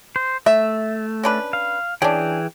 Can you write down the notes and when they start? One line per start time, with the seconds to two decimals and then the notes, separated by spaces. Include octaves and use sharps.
0.16 C5
0.46 A3 E5
1.23 C#4 D4 B4
1.53 F5
2.02 E3 C#4 D4 G#4 G5